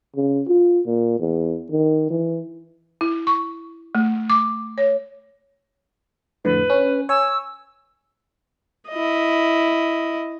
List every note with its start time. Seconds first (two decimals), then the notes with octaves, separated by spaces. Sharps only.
0.16 C#3
0.48 F4
0.86 A#2
1.19 E2
1.71 D#3
2.10 E3
3.01 E4
3.27 C#6
3.95 A3
4.30 D6
4.78 C#5
6.45 F2 A2 D3 B4
6.70 C#4
7.09 C#5 G#5 E6
8.89 E4 D#5